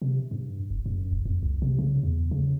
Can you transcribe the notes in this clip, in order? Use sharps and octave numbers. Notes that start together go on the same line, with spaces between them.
C3
G2
F1
F#2
E1
F2
C2
C3
C#3
E2
C#3